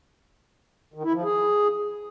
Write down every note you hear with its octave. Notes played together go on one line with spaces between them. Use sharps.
D#3
E4
F3
G#4